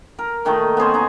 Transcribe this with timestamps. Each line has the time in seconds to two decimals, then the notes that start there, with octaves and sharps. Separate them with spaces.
0.19 A#4
0.45 A#2 D#3 A3 D#4
0.77 B3 C#4 G#4 C5
0.94 D#4 G#4